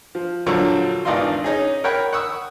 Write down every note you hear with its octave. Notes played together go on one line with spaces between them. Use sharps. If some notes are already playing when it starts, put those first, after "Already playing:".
F3
A#1 D3 F3 F#3 C#6
G#1 E2 D4 D#4 F4 C6
C#4 D#4 G#4
A#4 C#5 F#5 G5 B5
F#5 C#6 D#6 E6